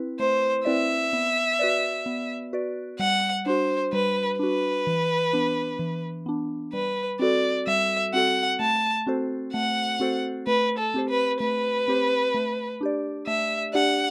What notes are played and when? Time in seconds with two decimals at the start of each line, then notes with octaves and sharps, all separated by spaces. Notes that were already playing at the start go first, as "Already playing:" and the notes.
Already playing: C4 E4 B4
0.19 A3 C5
0.65 C4 E4 B4 D5 E5
1.13 B3
1.59 F#4 B4 D5
2.06 B3
2.53 F#4 B4 D5
2.99 G3 F#5
3.46 D4 F#4 C5
3.93 G3 B4
4.39 D4 F#4 B4
4.87 E3
5.33 B3 D4
5.79 E3
6.26 B3 D4
6.73 G3 B4
7.19 C4 F#4 A4 D5
7.67 G3 E5
8.13 C4 F#4 A4 F#5
8.59 A3 A5
9.07 C4 F#4 A4 C5
9.53 A3 F#5
10.00 C4 F#4 A4 C5
10.47 A3 B4
10.78 A4
10.94 C4 G4 C5
11.09 B4
11.40 A3 B4
11.88 C4 G4 C5
12.34 A3
12.81 D4 G4 D5
13.27 A3 E5
13.73 D4 G4 D5 F#5